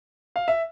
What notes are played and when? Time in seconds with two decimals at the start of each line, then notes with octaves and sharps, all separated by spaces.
0.36 F5
0.48 E5